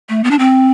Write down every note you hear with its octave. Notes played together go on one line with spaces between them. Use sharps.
A3
B3
D4
C4